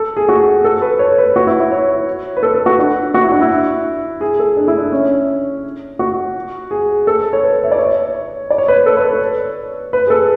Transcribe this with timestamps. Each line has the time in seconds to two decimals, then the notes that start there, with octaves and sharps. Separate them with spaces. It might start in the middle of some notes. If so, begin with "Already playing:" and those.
Already playing: A4
0.17 G#4
0.29 F#4
0.64 A4
0.82 B4
0.99 C#5
1.18 B4
1.36 F#4
1.47 E4
1.60 E4
1.71 C#5
2.37 B4
2.43 A4
2.54 A4
2.66 F#4
2.79 D4
3.14 F#4
3.22 E4
3.31 D4
3.41 E4
4.21 G#4
4.39 A4
4.57 D4
4.68 E4
4.78 D4
4.92 C#4
5.99 F#4
6.71 G#4
7.07 A4
7.33 C#5
7.43 B4
7.64 E5
7.72 D5
7.79 C#5
8.50 D5
8.58 C#5
8.68 B4
8.86 A4
8.97 B4
9.09 C#5
9.93 B4
10.07 G#4
10.10 A4